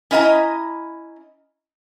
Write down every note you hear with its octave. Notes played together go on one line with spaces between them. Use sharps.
C#4 E4 D#5 F5 A#5